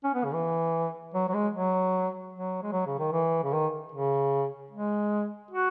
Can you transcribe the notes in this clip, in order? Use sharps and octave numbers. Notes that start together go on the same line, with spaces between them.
C#4
B3
C#3
E3
F#3
F#3
G#3
F#3
F#3
G#3
F#3
C#3
D#3
E3
C#3
D#3
C#3
G#3
F#4